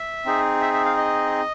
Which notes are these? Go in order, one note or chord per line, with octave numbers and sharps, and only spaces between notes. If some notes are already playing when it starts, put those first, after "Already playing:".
Already playing: E5
C4 D#4 G#4
E5
E5
F5
D#5